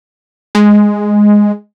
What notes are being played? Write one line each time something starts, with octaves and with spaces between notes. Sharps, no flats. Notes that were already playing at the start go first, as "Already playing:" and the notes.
G#3